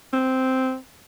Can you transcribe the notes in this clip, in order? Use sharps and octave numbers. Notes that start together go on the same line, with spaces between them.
C4